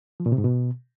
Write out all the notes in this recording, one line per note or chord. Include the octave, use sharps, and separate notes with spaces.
F3
A#2
C3
G#2
B2